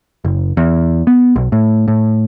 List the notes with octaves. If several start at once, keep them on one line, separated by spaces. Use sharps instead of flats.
F#1
E2
B3
B1
A2
A2